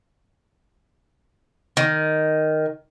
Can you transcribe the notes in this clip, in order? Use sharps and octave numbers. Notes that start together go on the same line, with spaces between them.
D#3